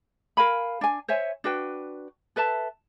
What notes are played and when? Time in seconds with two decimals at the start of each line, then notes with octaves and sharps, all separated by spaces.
0.37 A#4 F5 G#5 B5
0.81 D4 G#5
1.08 C5 C#5 E5 G#5
1.44 D4 F#4 B4 G5
2.36 A4 B4 E5 A5